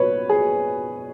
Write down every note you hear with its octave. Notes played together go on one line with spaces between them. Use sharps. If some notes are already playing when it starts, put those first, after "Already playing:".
Already playing: B2 B4 C#5
G#4